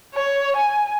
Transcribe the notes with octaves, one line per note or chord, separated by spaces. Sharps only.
C#5
G#5